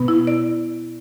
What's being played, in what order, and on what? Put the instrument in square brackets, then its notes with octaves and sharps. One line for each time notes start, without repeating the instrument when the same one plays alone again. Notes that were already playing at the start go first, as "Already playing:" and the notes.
Already playing: [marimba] B2 B3
E4
D5